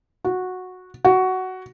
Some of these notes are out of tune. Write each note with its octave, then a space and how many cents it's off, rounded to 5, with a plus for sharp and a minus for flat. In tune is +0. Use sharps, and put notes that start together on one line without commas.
F#4 -10
F#4 +10